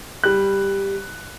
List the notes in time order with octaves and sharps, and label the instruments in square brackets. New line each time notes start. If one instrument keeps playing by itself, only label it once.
[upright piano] G3 F#6